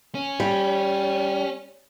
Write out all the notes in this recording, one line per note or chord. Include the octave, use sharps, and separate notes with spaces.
C#4
G3